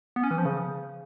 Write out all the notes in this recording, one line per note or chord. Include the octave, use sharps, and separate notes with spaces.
B3
C#4
E3
F3
C#3